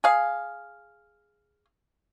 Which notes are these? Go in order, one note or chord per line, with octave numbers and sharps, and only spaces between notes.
G#4 F5